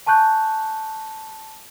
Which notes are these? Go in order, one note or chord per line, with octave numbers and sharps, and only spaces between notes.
G#5 A5 C#6 F#6 G6